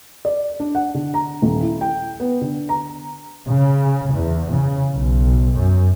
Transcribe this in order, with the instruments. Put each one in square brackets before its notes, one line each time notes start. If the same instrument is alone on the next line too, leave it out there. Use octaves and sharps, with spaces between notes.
[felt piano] D5
D4
F#5
D3
A#5
D#1
E4
G5
B3
D3
A#5
[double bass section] C#3
E2
C#3
B1
F#2